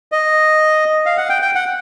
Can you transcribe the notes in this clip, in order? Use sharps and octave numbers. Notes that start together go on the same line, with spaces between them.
D#5
F5
F#5
G5
G5
F#5